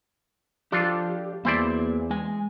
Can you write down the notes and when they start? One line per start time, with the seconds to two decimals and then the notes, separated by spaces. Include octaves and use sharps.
0.72 F3 D4 F4 G4 A4
1.45 E2 A#3 E4 C5 D5 G#5
2.10 G#3 G#5